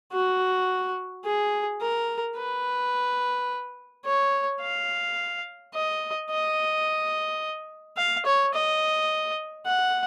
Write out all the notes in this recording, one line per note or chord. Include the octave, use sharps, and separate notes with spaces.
F#4
G#4
A#4
B4
C#5
F5
D#5
D#5
F5
C#5
D#5
F#5